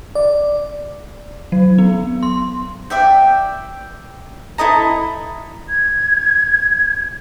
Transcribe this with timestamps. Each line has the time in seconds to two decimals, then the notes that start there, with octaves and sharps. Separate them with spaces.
0.15 D5
1.52 F#3
1.78 B3
2.23 C6
2.90 D5 E5 G5
4.58 E4 A4 D#5 A#5
5.69 G#6